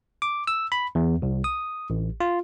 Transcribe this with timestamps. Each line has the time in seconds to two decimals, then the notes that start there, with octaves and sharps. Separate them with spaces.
0.22 D6
0.47 E6
0.72 B5
0.95 E2
1.22 C2
1.44 D#6
1.90 A1
2.20 F4